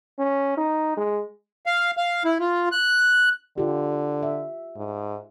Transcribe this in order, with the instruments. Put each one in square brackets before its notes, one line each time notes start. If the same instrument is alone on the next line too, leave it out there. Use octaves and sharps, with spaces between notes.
[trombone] C#4
D#4
G#3
[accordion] F5
F5
E4
F4
F#6
[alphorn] D3 [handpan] F4 G4
[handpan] E5
[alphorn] G#2